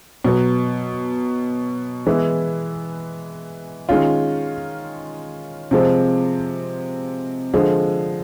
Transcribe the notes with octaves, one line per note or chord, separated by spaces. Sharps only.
B2 F#3 B3
E3 G#3 B3 E4
D#3 G#3 C#4 F4
C3 F3 G#3 C4
D3 F3 G#3